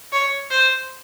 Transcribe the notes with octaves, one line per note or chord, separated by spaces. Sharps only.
C#5
C5